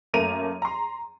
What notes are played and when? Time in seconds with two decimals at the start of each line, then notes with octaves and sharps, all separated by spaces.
0.14 F#2 A3 A#3 A#5 D#7 F7
0.62 A#5 C6